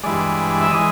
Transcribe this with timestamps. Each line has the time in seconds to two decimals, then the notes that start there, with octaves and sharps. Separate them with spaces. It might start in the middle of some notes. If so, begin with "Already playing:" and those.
0.03 G2 E3 G#3 D5
0.61 E5
0.71 E3 G#3 D#5